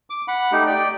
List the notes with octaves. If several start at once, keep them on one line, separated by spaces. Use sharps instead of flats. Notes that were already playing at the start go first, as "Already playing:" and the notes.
D6
F#5 B5
A3 D#4 G4
D5 G5